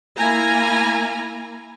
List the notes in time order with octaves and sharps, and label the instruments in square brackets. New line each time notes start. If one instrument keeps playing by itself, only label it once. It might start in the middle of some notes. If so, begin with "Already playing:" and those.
[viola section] A#3 E4 G#5 A#5